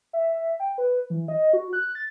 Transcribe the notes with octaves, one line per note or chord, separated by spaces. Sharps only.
E5
G5
B4
E3
D#5
F#4
F#6
A6